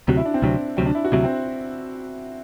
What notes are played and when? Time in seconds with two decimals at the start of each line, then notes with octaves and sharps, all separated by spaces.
0.08 D2 C3 F#3 F#4
0.17 E4
0.25 D4
0.34 C4
0.42 D2 C3 F#3 D4
0.77 D2 C3 F#3 C4
0.86 D4
0.95 E4
1.05 F#4
1.12 D2 C3 F#3 E4
1.24 C4